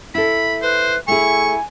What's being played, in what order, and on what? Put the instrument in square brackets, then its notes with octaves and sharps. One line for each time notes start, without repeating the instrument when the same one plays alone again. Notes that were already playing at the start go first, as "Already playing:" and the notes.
[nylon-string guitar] E4 A4 [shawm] B5
[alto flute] B4 [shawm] C5
[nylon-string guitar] A3 G#4 [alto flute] E4 [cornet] G#5 [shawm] C#6